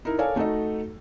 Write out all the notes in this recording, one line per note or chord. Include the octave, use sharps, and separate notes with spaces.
D#4 E4 A#4
A4 A#4 C#5 D5 F5 G#5
A3 D#4 F#4 A4 D#5